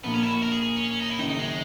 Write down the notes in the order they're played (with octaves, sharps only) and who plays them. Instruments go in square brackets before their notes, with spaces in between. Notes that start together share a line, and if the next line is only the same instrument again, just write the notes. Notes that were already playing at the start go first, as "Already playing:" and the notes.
[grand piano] A#1 A#2 A#3 [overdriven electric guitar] B3
[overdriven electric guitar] C#4
E4
F#4
A#4
G#4
G#4
C#4
C#4
D#4
E4
[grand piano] F#1 F#2 D#3 [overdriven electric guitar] D#4
[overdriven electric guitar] D#4
G#3